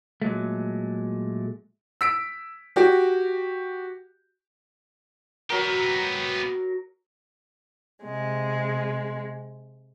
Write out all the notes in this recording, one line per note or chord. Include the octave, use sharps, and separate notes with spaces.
A#2 F#3 G#3 A3
E6 B6 D7
F#4 G4
F#3 B3 G4 A#4
C3 G#3